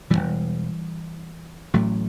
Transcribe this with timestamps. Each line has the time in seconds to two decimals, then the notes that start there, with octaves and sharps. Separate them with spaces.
0.10 E1 E2 B2 E3 G3
1.74 A1 A2 F#3 A3